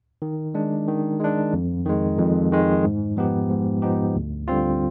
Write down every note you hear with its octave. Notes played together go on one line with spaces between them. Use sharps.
D#3
G#3 D4
D#3
G#3 D4
F2
D#3 G#3
F2
D#3 G#3
G#2
F3 B3 D#4 G4
G#2
F3 B3 D#4 G4
D2
D3 G3 C4 F4